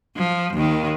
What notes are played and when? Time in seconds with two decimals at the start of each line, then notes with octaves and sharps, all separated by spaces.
0.17 F3
0.54 D#2 D#3